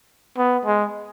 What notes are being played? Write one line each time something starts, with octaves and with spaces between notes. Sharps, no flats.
B3
G#3